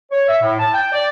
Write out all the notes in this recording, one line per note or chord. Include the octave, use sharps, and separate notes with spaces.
C#5
E5
A2
A5
G5
D5